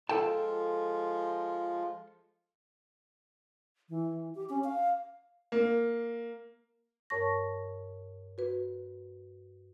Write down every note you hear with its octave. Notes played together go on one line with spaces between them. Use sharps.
F3 G#3 F4 A4 G5 A5
E3
G4
C#4
F5
A#3
G2 A#4 C#5 A5 C#6 A#6
F#4 B4